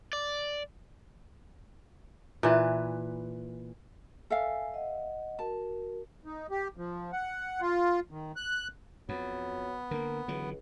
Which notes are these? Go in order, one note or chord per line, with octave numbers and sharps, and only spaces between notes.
D5
A#2 E3 B4
A4 E5 F5 G#5
D#5 F#5
F#4 A#4 A5
D#4
G4
F3
F#5
F4
D#3
F#6
F2 F#3 B3
D3 A#3 A#4
C#2 D3 E3 F#3